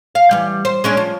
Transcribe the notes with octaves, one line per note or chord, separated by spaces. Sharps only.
F5
E3 G3
C5
G#3 C#4 D4
F3